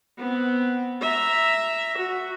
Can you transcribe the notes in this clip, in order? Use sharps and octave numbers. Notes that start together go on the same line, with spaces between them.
B3 C4
E5 A#5
F#4